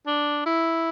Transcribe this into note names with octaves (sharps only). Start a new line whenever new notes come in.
D4
E4